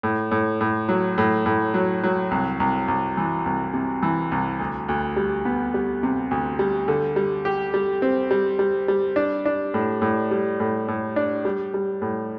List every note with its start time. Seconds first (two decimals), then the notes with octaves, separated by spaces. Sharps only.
0.03 A2
0.31 A2
0.61 A2
0.89 F#3
1.18 A2
1.46 A2
1.74 F#3
2.03 F#3
2.31 C2
2.60 C2
2.88 C2
3.17 E3
3.46 C2
3.74 C3
4.03 E3
4.32 C2
4.60 D2
4.89 D2
5.16 G3
5.45 B3
5.74 G3
6.03 C3
6.31 D2
6.59 G3
6.88 D3
7.16 G3
7.45 G4
7.74 G3
8.02 C4
8.31 G3
8.59 G3
8.88 G3
9.16 D4
9.45 D4
9.74 A2
10.02 A2
10.31 G3
10.60 A2
10.88 A2
11.16 D4
11.45 G3
11.74 G3
12.02 A2